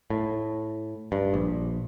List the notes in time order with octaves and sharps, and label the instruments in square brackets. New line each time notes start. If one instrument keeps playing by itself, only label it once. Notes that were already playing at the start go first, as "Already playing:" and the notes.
[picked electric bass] A2
G2
A#1